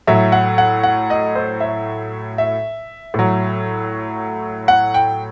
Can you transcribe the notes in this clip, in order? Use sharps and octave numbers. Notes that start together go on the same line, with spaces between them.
A2 F#3 E5
F#5
F#5
F#5
D#5
C5
E5
E5
A2 F#3
F#5
G5